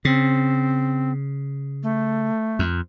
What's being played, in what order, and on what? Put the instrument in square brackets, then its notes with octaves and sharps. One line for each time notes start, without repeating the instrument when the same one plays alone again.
[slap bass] C#3 [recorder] C4
[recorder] A3
[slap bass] F2